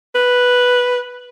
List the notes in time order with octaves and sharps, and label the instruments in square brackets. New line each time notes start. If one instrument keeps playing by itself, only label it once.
[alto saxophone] B4